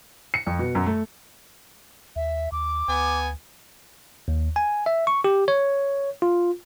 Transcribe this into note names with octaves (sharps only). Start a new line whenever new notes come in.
C#7
F2
B2
F#2
A3
D#2 E5
D#2 D6
D2 B3 G#5
D#2
G#5
E5
C#6
G4
C#5
F4